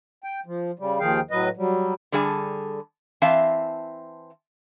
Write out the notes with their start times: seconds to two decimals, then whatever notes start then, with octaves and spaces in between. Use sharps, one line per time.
0.24 G5
0.46 F3
0.79 C#3 G3
1.00 D#2 D#3 F3 G#4 F5 G5
1.31 A2 F#3 B4 D#5
1.57 F#3 G3
2.12 D3 G3 G#4 F#5 A5
3.22 E3 C4 E5 F5 A5